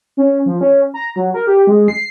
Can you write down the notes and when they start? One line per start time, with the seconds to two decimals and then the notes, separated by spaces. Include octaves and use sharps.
0.17 C#4
0.46 F3
0.61 C#4
0.94 A#5
1.16 F#3
1.34 A#4
1.47 G4
1.67 G#3
1.88 C7